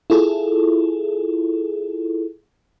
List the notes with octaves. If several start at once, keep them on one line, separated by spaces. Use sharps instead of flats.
E4 F4 G#4 A4